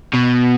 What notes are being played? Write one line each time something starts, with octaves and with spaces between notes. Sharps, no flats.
B2